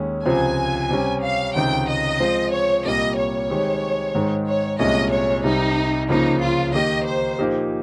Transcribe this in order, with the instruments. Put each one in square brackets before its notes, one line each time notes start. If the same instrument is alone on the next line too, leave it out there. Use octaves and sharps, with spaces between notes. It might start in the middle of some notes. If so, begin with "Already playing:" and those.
Already playing: [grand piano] D#2 D#3 G#3 C#4
[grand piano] C#2 C3 F3 [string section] G#5
[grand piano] C3 G3 C#4
[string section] F5
[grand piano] C#2 C3 D#3 [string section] G5
[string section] D#5
[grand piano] F3 G#3 C4 F4 C5
[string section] C#5
[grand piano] C2 A#2 G3 A#3 [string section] D#5
[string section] C#5
[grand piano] D#3 G#3 C4 G4
G#2 D#3 G#3 D#4 G#4
[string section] C#5
[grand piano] C2 A#2 G#3 C#4 [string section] D#5
[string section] C#5
[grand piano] C2 C3 G3 [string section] D#4
[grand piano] C#2 C#3 F3 A#3 [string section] D#4
[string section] F4
[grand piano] D#3 A#3 D#4 G4 [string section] D#5
[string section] C5
[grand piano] A#2 F3 A#3 D#4 G4